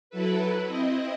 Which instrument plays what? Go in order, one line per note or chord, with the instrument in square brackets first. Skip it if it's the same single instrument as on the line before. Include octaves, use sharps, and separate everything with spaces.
[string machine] F#3 E4 A4 B4
C4 E4 D#5